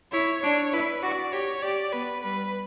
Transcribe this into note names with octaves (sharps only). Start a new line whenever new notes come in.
E4 C#5
D4 C#5
E4 B4
F#4 D5
G4 C#5
G4 D5
B3 B4
G3 B4